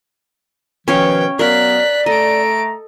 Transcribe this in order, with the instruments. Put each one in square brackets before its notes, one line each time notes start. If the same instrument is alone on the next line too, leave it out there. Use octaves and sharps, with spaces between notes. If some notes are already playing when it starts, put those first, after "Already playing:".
[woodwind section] B2 D#3 F3 [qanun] C#4 C#5 F5 [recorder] B4 [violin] G5
[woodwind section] F#3 B3 [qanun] A#4 F5 [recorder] D5 [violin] F#6 B6
[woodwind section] A3 A#5 [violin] A4 D7 [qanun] D#5